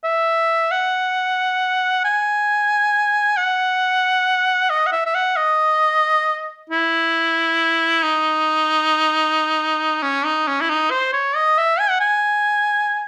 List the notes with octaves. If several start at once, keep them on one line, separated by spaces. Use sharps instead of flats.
E5
F#5
G#5
F#5
D#5
F#5
E5
E5
F#5
D#5
E4
D#4
C#4
D#4
C#4
E4
D#4
C5
C#5
D#5
E5
G#5
F#5
G#5